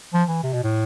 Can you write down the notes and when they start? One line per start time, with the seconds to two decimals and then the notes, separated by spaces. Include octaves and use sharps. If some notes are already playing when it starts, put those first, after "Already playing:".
0.13 F3
0.28 E3
0.44 C3
0.53 B2
0.64 A2